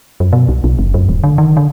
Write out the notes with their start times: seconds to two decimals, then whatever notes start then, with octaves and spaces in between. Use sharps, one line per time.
0.20 F#2
0.33 B2
0.49 C2
0.64 B1
0.79 F#1
0.94 F#2
1.09 D1
1.24 D3
1.38 D#3
1.57 D3